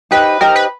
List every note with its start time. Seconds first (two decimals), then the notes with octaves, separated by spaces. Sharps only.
0.11 D#4 G4 B4 C5 D#5
0.41 D#4 G4 A#4 C5 D#5
0.56 B4